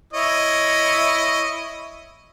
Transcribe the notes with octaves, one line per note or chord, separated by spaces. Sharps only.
E4 C#5 D#5